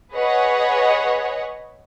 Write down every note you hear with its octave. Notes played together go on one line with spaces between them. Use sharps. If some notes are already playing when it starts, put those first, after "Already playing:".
G#4 B4 C#5 D#5 F#5